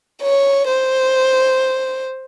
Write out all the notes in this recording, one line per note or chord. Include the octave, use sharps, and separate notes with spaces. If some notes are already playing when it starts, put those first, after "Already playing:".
C#5
C5